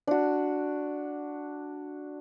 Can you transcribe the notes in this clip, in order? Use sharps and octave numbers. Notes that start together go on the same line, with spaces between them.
D4 F#4